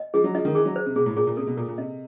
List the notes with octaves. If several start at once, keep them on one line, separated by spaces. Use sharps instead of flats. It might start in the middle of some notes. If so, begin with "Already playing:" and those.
Already playing: D#5
F3 G#4
F#3
F3 D#5
D#3
E3 G#4
F#3
C5
C3
B2 G#4
A2
A#2 G#4
A#2
C3 A4
B2
A#2 A4
A#2
C3 D#5